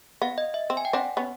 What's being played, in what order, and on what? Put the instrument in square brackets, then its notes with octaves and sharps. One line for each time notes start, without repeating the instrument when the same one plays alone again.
[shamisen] B3 [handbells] F5
[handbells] D#5
E5
[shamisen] C4
[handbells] G#5
G5
[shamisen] C4 D4 [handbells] F#5
[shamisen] B3 C#4